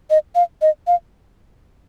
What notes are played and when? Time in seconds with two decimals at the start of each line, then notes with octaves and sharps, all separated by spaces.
0.10 D#5
0.35 F5
0.62 D#5
0.87 F5